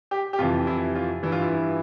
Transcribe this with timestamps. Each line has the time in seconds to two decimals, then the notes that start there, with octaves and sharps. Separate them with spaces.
0.11 G4
0.33 G4
0.38 F2 C3 E3 F4
0.67 E4
0.95 F4
1.23 G2 E3 E4
1.32 F4
1.42 E4